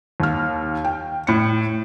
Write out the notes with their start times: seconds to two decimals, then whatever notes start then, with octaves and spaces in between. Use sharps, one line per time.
0.20 D#2 F6
0.84 G5
1.27 A2 C#7